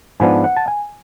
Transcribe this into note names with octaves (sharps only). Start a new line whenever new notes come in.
G#2 F3 B3 D4 G#5
F#5
A5
G#5